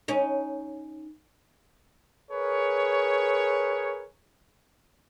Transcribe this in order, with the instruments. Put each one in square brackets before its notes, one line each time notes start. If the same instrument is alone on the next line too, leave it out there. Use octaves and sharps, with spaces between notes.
[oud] C#4 D#4
[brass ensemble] G#4 A#4 B4 C#5